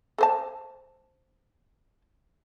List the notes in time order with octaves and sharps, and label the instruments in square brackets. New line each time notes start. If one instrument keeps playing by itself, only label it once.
[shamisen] A4 C5 A5